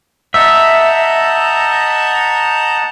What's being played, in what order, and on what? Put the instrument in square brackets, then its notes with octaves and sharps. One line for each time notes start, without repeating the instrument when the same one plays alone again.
[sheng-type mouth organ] D#5 F#5 G6 [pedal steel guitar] E5 [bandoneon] A5 A#5